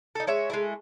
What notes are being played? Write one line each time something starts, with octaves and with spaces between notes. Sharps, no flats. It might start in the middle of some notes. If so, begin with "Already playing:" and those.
D#4 A4
G#3 C#5 E5
G#3 A3 E4